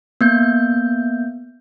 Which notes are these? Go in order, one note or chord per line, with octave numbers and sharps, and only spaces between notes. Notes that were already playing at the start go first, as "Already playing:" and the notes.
A#3 B3 G6